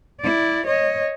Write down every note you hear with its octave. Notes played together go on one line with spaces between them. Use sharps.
E4 D5
C#5 D#5